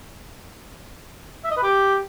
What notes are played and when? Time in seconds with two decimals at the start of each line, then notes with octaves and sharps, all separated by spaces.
1.44 E5
1.50 D#5
1.57 B4
1.63 G4